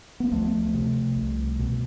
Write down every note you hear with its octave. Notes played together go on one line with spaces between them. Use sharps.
B3
D2 F3 A3
C3
C2
B2